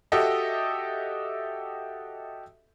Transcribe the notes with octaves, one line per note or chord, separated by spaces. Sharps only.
F#4 G4 A4 D#5 E5